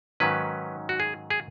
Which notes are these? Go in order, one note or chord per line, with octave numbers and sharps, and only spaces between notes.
G#2 D#3 F#3 C#4 B4
F#4
G#4
G#4